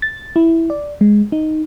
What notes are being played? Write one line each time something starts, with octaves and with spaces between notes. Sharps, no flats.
A6
E4
D5
G#3
D#4